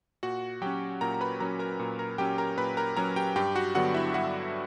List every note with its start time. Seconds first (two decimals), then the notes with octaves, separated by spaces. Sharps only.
0.23 A#2 F#4 F#5
0.62 F#3 C#4 G4 G5
1.01 A#2 A#4 A#5
1.14 A#5
1.21 B4 B5
1.40 F#3 C#4 A#4 A#5
1.59 A#4 A#5
1.80 A#2
1.99 A#4 A#5
2.18 F#3 C#4 G4 G5
2.38 A#4 A#5
2.58 A#2 B4 B5
2.77 A#4 A#5
2.97 F#3 C#4 A#4 A#5
3.16 G4 G5
3.36 G2 G4 G5
3.56 F#4 F#5
3.75 D3 F#3 B3 D4 F#4 F#5
3.94 E4 E5
4.14 G2 F#4 F#5